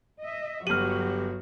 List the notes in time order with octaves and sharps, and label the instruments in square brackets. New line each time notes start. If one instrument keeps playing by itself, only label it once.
[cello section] D#5 E5
[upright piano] G1 F#7 [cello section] F#3 F#4 [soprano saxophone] G4 [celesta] F6 D#7